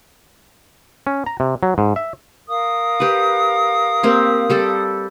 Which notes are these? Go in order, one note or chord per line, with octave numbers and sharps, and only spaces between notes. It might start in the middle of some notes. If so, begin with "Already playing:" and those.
C#4
A#5
C3
F#3
G#2
E5
A#4 F5 D#6
G4 B4
A#3 C4 G4
G3 G4 A4